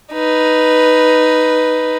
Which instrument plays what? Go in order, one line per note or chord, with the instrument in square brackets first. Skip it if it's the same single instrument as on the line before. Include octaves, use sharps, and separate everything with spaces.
[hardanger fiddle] D#4 B4